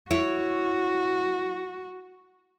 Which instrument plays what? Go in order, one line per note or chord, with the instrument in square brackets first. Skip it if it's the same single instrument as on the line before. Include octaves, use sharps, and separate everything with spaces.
[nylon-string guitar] E4 C#5 [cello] F#4